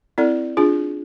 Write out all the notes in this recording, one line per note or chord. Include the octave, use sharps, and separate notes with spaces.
C4 E4 A4 D5
D4 F4 G#4